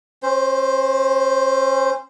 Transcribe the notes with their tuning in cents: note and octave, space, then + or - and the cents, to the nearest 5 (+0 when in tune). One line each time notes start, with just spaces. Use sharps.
C#4 -35 C5 +0